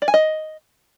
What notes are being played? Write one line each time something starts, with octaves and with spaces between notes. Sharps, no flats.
D5
G#5
D#5